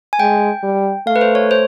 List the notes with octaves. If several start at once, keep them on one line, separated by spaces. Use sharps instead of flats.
G#5
G#3 G5
G3
A3 F5
B4
C5
C#5
C5